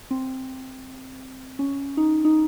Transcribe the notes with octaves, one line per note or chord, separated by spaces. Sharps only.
C4
C#4
D#4
D#4